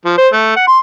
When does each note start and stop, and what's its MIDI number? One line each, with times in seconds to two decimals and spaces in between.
0.05 0.18 53
0.18 0.28 72
0.33 0.53 57
0.56 0.67 78
0.68 0.78 84